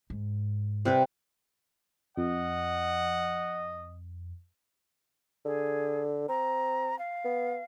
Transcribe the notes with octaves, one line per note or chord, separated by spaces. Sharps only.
G#2
C3 G3 B4
F2 D#5 F#5
D3 G#4
C4 A#5
F5
B3